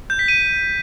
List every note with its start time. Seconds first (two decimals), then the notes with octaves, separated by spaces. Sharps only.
0.10 G6
0.19 B6
0.28 D#7